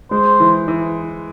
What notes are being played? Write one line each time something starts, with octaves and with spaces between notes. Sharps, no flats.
G#3 C5
E3
E3